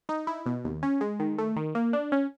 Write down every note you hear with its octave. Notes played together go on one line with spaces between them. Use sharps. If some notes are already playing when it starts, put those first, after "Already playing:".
D#4
E4
B2
D#2
C#4
G#3
D#3
A3
D#3
A#3
D4
C#4